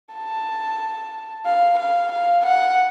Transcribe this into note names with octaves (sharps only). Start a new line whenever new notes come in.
A5
F5
F5
F5
F#5